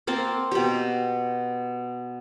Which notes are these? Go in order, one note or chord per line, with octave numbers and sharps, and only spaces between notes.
A#3 C4 A5
B2 G4